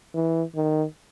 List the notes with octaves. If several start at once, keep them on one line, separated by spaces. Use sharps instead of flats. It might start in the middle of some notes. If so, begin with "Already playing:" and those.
E3
D#3